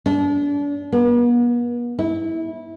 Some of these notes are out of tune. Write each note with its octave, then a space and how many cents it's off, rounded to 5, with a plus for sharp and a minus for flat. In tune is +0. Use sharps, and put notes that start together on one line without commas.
D4 -35
B3 -45
E4 -20